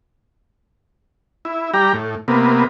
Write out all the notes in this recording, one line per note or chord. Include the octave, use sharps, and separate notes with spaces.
E4
G3 G4 A#5
A2
C3 A#3 B3